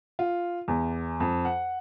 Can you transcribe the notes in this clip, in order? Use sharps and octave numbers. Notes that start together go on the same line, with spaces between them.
F4
E2
F2
F#5